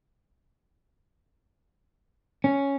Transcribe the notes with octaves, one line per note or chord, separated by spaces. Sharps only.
C#4